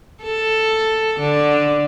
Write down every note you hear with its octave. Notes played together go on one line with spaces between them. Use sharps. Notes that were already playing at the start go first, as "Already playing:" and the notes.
A4
D3